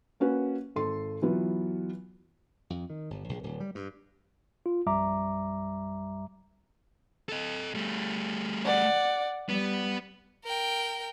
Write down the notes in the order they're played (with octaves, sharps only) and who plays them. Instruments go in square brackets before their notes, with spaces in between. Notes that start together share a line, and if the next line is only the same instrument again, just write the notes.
[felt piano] A#3 C#4 F#4 B4
G#1 A4 C6
E3 F#3 B3 F4
[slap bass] F2
D#3
G1
A#1
D1
G3
G2
[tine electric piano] F4
A#1 F#2 G3 E5 A#5 D6
[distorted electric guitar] A4 D#5
G3 A3
[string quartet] D5 F#5
[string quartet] G3 [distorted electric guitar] B3
[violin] A#4 G5